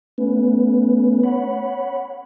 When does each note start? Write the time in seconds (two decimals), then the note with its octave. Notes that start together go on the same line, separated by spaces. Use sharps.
0.18 A3 B3 C#4 B4
1.23 C#5 F#5 B5